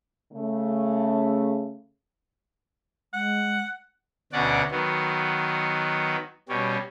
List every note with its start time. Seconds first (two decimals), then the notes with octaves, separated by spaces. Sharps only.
0.33 C#3 A3
3.13 G#3 F#5
4.33 D2 B2 C#4 D4 D5 F#5
4.71 D#3 F#3 B3
6.49 B2 G3 C#4